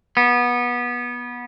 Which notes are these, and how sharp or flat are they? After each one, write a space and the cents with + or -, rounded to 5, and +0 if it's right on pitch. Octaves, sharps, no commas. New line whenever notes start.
B3 -20